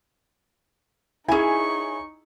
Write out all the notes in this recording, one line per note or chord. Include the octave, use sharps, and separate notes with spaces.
C#4 D#4 E4 G#4 G#5 C#6